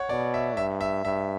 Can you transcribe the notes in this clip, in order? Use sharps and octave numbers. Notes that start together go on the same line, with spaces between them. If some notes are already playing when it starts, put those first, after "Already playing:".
Already playing: C#5 F#5
B2 D5
E5
G2 E5
E5
G2 E5